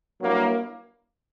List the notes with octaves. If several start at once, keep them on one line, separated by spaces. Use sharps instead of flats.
G2 F#3 A#3 E4